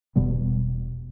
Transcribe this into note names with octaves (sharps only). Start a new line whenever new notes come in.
E1 B2 G3 B3